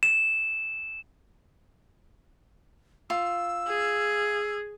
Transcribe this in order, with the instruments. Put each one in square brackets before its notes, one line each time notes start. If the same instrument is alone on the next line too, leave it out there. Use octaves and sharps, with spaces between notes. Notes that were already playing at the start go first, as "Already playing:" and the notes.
[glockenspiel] E7
[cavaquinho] F4 [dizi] E6
[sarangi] G#4